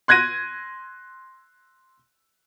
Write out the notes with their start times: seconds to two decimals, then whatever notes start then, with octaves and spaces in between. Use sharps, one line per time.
0.08 C6 F#6 G#6 A#6 D#7